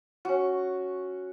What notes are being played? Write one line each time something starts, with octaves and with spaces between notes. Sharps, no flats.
C#4 F#4